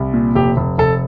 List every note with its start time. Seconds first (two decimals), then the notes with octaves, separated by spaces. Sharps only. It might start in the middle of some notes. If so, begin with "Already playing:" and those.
Already playing: C2
0.14 A#2
0.35 F1 G4
0.57 F1
0.78 F1 A4